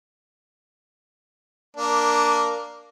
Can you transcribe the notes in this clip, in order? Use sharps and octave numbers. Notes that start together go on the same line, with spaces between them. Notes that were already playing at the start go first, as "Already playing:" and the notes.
A#3 D4